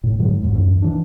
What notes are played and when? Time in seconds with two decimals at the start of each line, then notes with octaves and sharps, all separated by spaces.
0.04 A2
0.19 G#2 D3 F#3 G#3
0.41 B1 E2 G#2
0.53 C#2 F#2 E3
0.82 E3 D4